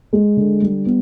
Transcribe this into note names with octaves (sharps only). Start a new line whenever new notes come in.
G#3
D3
G3
B3